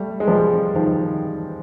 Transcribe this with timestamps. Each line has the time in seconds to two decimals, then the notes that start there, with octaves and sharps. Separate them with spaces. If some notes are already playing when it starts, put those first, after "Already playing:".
Already playing: G3 A3
0.20 G#3
0.28 F3 G3
0.75 D#3 F3